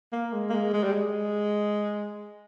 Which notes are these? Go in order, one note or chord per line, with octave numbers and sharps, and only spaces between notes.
A#3
G#3
A#3
G#3
G#3
G3
G#3